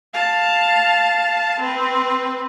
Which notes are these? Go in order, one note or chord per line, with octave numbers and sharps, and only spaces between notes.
F5 A5
C4 B4